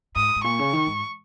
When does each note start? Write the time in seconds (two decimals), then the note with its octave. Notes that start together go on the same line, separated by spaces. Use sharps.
0.16 G#2 D#6
0.36 G#2
0.44 A#2 C#6
0.59 C#3
0.73 D#3
0.87 G#2